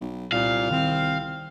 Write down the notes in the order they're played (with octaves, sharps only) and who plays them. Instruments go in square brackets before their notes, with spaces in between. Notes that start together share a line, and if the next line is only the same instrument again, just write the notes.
[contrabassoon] B1
[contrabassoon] C2 [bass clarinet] A#2 [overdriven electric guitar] F5
[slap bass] D#3 [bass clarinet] C4